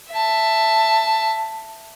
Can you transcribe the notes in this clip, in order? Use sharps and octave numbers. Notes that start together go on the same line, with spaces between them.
E5 A5